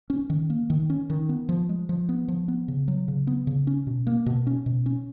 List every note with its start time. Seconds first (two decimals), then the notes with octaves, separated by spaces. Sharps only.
0.10 C#4
0.30 D#3
0.50 A#3
0.70 D#3
0.90 C#4
1.10 D#3
1.29 B3
1.49 F3
1.69 G#3
1.89 F3
2.09 B3
2.28 F3
2.48 B3
2.68 C#3
2.88 F#3
3.08 C#3
3.27 B3
3.47 C#3
3.67 C#4
3.87 B2
4.07 A#3
4.26 B2
4.47 C#4
4.66 B2
4.86 C#4